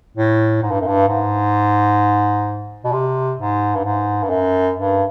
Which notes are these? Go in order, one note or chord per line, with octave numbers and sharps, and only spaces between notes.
A2
G#2
G2
F#2
G2
G#2
B2
C3
G#2
G2
G#2
G2
F#2
G2